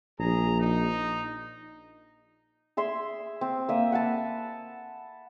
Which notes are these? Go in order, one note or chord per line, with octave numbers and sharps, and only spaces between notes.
A#1 G#4 A#5
D#4
G#4 E5 C6
C4
A#3 E5 D#6
F#5 G#5 A5 B5